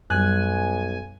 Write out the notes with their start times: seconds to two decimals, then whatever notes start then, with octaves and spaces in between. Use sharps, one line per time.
0.10 B1 F#2 G3 G#5 F#6